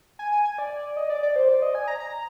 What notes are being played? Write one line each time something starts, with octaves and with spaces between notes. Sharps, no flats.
G#5
G#5
G#5
D5
D#5
D5
D5
C5
D5
D#5
G#5
A#5
A#5